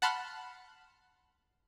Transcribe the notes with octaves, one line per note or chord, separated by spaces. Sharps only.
F#5 A5 B5 C6 F6 F#6